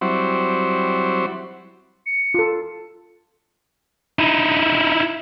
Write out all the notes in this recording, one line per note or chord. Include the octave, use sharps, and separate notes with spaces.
F#3 G3 C4 E4 F#4 C5
C#7
F4 A4
D#4 E4